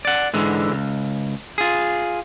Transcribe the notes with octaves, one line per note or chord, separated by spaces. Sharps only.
D5 F#5
G#2 D3 E3 G#3
C#2
F4 G#4